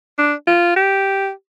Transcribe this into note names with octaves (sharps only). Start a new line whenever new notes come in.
D4
F4
G4